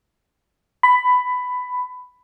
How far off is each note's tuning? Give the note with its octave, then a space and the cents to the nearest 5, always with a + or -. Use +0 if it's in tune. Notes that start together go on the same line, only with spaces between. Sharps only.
B5 +15